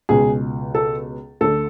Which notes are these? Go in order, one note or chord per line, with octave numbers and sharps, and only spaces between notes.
C#2 B2 G#4
A4
D2 D3 A4